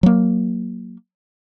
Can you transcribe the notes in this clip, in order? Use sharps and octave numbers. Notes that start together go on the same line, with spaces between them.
F#3 A#3